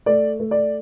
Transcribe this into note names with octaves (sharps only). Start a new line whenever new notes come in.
A3 D5
A3
D5